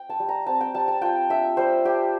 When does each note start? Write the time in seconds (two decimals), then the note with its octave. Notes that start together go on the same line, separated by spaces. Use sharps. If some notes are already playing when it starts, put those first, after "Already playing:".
Already playing: G5
0.09 A5
0.20 G3
0.29 A#5
0.46 C4 A5
0.61 G5
0.74 G3 A5
0.88 A5
1.02 F4 G5
1.30 D4 E5
1.57 G3 C5
1.85 G3 G4